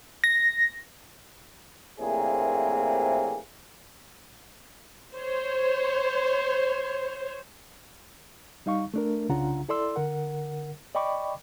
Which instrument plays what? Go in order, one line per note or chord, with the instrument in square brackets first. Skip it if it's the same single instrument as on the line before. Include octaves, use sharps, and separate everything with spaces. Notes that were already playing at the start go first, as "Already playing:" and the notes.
[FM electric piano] A#6
[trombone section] A#1 A2 C3 A#3 C4 G#4
[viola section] C5 C#5
[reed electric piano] G3 D#4 F5 C#6
A3 D4 A#4
C2 C#3 D4 F4 F#5 A#5
E4 A4 D5 C6 E6
D3 A#4 F#5
D5 D#5 G5 B5 C#6 D6